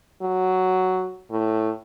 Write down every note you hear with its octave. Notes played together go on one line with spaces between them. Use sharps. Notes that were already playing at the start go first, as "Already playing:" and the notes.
F#3
A2